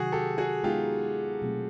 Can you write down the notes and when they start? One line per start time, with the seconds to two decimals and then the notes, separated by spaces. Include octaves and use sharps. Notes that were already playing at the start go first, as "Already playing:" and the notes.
Already playing: C3 D#3 F#3 F#4 G#4
0.12 G4 A4
0.38 F#4 G#4
0.63 G#3 B3 D#4 F4 G4
1.42 B2 F#3 A3 C4